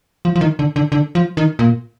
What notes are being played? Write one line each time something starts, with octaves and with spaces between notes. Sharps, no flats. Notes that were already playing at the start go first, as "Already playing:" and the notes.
F3
F3
D#3
D3
D3
D3
F3
D#3
A#2